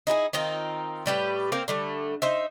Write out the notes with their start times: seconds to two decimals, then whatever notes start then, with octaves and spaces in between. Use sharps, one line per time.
0.07 D#4 E4 G4 G#4
0.33 D#3 C4 D#4 F4
1.06 A2 G3 G4 B4
1.52 A#3 C4 A#4 F5
1.68 D3 G3 A3
2.22 D#4 C5 E5